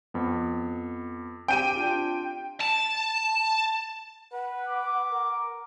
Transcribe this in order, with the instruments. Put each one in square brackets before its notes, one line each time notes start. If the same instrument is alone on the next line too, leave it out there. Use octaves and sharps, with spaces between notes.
[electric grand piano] F2 B3
[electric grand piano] C4 G4 [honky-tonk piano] G5 D#7
[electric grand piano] D4 F4 G4
[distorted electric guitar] A5
[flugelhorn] B4 [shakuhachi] F#5
[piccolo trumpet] D6
[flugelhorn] A#4